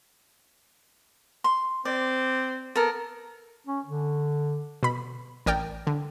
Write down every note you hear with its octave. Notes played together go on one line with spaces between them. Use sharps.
C6
C4 D5
B3 A4 A#4
C#4
D3
B2 B5
A1 A#4 D5 G5
D3